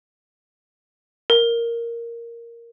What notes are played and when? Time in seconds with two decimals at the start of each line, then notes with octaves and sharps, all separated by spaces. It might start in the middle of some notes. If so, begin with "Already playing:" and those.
1.30 A#4